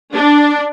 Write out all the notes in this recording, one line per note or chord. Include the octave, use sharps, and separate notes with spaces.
D4